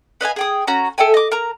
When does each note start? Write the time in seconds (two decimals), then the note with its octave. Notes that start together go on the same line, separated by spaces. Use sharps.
0.21 B4 D#5 F5 G#5
0.36 G#4 G5 D#6
0.67 C#4 F#4 A#5
0.98 A4 E5 G5 G#5
1.14 D#5 D6
1.32 A#4 A#5